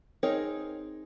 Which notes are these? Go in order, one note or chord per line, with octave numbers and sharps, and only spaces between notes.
C4 D#4 G#4 A#4 C#5